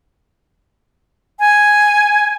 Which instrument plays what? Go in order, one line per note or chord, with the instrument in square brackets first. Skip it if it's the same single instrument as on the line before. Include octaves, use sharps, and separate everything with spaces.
[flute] G#5